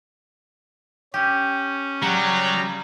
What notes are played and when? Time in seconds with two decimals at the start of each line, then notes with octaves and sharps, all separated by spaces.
1.14 C#4 G4
2.02 C#3 F#3 G3 F#5 A#5